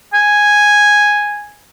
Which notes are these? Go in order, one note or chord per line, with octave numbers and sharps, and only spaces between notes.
G#5